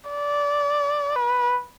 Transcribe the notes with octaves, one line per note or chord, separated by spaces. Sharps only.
D5
B4